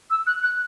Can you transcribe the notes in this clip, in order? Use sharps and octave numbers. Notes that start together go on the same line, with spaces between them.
E6
F#6
F#6